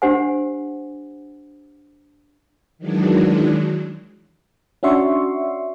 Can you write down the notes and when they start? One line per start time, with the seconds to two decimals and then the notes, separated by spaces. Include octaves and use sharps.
0.02 D4 G4 C5 F#5 G#5
2.78 D#3 E3 F#3 G#3 D4
4.83 C#4 D4 F#4 E5 C6 C#6